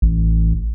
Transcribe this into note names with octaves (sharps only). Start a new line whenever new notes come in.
A1